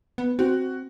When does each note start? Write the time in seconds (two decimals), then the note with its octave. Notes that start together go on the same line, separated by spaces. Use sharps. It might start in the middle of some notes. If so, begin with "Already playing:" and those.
0.18 B3
0.39 C4 F#4